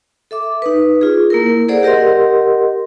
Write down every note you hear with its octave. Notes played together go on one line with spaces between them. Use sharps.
A4 E5 D6
D#4 B4
F4 G#4
A#3 E4 A#4
G#4 A4 C5 D5 F#5
G4 A#4 D#5 F#5 C6